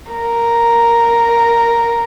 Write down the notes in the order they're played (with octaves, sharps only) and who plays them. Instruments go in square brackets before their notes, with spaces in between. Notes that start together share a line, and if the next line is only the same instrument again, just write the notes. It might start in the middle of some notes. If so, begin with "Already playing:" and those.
[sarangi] A#4